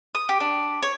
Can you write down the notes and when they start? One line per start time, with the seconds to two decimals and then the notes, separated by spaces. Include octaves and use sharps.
0.15 D#6
0.29 G4
0.40 D4
0.83 C#5